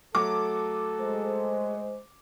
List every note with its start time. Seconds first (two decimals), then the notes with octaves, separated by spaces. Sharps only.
0.15 F#3 A3 F#4 A4 D6
1.01 G#3 C5